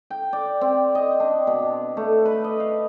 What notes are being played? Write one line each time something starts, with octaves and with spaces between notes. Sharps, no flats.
G5
D5
C4
D#5
D4
B2
A3
B4
D#5
F5